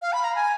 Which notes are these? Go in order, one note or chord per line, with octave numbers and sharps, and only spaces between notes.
F5
B5
A#5
G#5